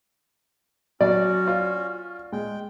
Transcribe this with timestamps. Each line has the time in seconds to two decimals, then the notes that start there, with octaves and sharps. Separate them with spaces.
1.01 F#3 C#4 F#4 D5
1.48 F4
2.32 G#3 G5